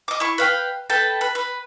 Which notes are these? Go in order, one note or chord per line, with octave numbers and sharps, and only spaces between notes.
D#5 D6
E4 C#6
B4 F5 G5
A4 B4 G5 A5
B4
B4